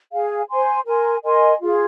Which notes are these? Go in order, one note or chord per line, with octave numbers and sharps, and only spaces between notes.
G#4 F5 G#5
C5 G#5 C6
A#4 G#5 C6
A#4 D#5 G#5 C6
F4 G#4 F5